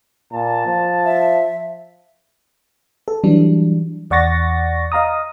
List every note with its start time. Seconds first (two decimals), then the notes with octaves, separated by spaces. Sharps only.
0.33 A#2 A5
0.67 F3
1.05 E5
3.08 A4
3.24 E3 F#3 G3 D4
4.11 E2 D5 F#5 C#6 A6 A#6
4.92 D#5 F5 A#5 D#6